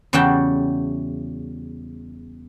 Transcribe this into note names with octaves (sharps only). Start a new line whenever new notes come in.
E2 C#3 G3 F#4 G5 A5